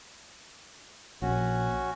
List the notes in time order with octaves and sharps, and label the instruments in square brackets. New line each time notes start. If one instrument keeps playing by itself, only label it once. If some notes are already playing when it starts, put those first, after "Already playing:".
[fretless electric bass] A#1 [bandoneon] C#4 F#4